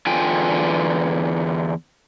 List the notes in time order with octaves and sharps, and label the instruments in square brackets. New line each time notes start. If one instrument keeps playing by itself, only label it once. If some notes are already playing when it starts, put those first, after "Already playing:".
[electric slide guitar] E2 D3 F4 G5 G#5